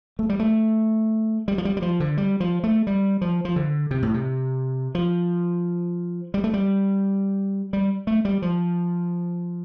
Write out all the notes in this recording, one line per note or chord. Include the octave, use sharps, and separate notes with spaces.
A3
G3
A3
G3
F3
G3
G3
F3
D3
G3
F3
A3
G3
F3
F3
D3
C3
A2
C3
F3
G3
A3
G3
G3
A3
G3
F3